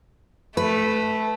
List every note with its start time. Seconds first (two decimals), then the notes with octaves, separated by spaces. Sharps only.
0.57 A3 B4